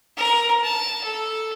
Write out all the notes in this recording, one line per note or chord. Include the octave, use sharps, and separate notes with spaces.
A#4
A5
A4